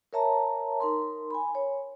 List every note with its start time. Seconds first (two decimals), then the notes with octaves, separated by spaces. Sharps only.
0.13 A#4 C#5 E5 A5 A#5
0.80 D#4 A#4 C6
1.30 G#5 B5
1.55 C#5